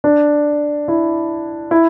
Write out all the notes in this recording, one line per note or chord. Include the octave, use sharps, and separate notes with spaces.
D4
E4
E4